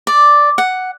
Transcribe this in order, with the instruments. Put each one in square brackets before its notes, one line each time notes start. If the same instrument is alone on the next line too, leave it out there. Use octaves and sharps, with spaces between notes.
[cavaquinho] D5
F#5